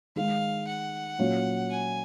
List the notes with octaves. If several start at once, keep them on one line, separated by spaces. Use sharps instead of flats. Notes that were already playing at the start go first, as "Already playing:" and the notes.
D#3 G#3 D#4 F5
F#5
A#2 F#3 C#4 F4
G#5